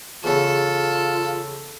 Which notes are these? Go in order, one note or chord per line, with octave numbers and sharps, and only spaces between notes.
E2 C#3 F4 A4